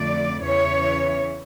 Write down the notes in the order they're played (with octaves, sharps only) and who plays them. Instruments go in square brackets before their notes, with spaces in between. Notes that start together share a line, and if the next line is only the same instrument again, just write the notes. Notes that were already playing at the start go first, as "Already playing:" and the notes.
Already playing: [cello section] F2 D3 A3 D5
E2 C#3 E3 C#5